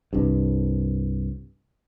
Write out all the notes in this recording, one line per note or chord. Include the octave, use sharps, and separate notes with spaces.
C2 G2